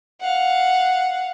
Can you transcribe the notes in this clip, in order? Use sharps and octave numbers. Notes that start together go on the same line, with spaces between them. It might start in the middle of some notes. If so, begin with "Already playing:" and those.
F5 F#5